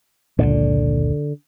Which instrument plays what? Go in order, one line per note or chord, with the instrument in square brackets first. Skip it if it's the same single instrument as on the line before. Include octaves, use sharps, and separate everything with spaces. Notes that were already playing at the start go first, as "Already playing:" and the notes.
[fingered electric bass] F1 C#2 A#2 [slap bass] D3